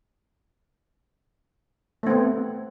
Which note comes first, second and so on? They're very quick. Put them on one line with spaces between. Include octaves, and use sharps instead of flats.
A3 C4 B3